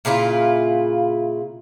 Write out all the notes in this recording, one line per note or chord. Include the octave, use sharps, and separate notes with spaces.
A#2 C#3 E4 F4